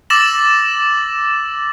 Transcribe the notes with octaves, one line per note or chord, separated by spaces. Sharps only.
D6 E6 A6 A#6 E7 F#7